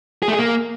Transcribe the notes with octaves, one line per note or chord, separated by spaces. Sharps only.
G#4
A3
G#4
A#3